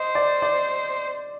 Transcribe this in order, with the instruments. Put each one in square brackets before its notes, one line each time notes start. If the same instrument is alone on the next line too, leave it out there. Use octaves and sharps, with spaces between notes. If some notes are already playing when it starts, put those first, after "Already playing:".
Already playing: [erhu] C5 [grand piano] D#5
[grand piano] D5
D5